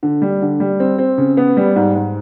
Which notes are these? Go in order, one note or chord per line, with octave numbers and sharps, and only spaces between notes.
D3
G3
D3
G3
C4
C4
C#3
B3
G3
G#2
G#2